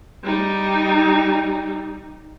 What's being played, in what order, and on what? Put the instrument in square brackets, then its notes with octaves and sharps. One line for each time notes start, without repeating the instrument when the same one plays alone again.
[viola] G3 D#4